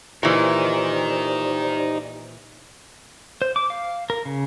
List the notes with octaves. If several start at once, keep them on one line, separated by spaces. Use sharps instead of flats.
A#2 E3 D#4 G4 A#4 C5 D5
C5
D6
F5
A#4
C#3